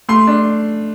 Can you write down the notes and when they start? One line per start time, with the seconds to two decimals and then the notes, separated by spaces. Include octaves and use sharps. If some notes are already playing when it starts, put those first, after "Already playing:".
0.09 A3 C6
0.27 D4